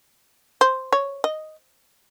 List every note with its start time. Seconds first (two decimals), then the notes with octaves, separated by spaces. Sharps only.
0.61 C5
0.93 C#5
1.24 D#5